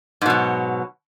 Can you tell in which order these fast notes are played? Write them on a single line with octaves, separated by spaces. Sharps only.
G#2 B2 F#3